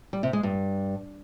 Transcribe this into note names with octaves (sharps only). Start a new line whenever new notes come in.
G3
C3
G#3
G2